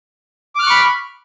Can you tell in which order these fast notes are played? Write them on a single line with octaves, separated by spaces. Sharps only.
D6 F6 F#6 C#6 B5